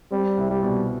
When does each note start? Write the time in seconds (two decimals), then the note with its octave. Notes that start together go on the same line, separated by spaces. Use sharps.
0.11 G3 C4
0.37 C2
0.50 G3
0.63 B2